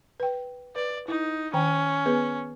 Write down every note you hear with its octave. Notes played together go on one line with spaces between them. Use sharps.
B4 G5
B4 D5
D#4 E4
D#3 C#4 G5 A#5
B3 G#4 B4